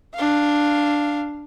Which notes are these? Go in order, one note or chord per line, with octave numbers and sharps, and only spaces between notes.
D4 F5